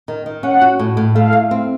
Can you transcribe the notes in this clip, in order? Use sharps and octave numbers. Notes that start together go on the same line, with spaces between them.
D#3
D#3
C#4 F#5
F#4
A2
A2
A3 F5
A3
C4